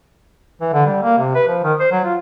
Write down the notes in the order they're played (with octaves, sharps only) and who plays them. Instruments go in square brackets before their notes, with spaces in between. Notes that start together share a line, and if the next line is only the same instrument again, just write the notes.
[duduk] E3
D3
G3
A#3
C3
B4
F3
D#3
C5
F#3
F4